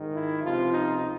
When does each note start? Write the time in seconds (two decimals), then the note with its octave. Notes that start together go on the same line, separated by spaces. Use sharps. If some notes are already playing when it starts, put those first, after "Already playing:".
Already playing: G#2 D#3
0.14 E4
0.43 C#2 C3 F3 F4
0.72 D#4